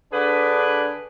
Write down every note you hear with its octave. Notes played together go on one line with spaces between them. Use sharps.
D3 D4 G#4 B4